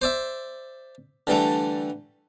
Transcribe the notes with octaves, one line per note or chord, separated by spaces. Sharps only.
C5 D5 E5
D3 E3 G3 A3